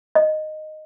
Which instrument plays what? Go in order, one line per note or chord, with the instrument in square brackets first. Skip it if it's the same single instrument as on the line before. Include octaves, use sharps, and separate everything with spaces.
[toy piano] D#5